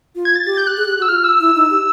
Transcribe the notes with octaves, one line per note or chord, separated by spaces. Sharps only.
F4
G#6
A6
G4 A6
G6
F#6
G#4
G4
F#4
E6
F4 F6
E6
E4
D#4
G4